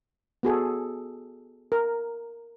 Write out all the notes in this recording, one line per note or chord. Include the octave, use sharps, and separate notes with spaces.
B3 F#4 G#4 A4
A#4